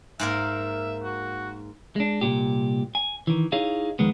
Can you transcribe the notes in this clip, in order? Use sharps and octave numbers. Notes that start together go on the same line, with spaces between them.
G#2 A#3 A#4 E5
F#4
G#3 D4
C2 A#2 G4
G#5
D#3 E3
D#4 E4 G#4 C#5 D#5 F5
F2 D#3 G#3 B3